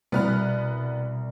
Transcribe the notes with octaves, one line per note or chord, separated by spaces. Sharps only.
C2 B2 B3 B4 F6